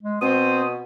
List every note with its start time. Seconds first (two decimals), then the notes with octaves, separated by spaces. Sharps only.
0.03 G#3
0.21 B2 C4 D#6